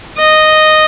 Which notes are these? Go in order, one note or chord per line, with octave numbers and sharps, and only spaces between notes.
D#5